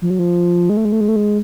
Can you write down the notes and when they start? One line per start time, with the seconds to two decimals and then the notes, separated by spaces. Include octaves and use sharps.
0.02 F3
0.10 F#3
0.19 F3
0.70 G#3
0.77 A3
0.85 G#3
0.92 A3
1.01 G#3
1.08 A3
1.16 G#3